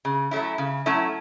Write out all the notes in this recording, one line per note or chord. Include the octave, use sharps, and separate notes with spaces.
C#3
F#3 A3 C#4 E4
C#3
F#3 A3 C#4 E4